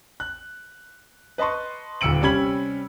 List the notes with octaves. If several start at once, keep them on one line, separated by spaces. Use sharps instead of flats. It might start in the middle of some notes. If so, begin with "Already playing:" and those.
F#6
B4 D#5 A5 C6 C#6
D#1 D2 E6 C#7 D7 F#7
C3 G3 C#4 B5 G#6 F#7